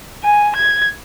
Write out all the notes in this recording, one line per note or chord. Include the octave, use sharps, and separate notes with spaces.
G#5
G#6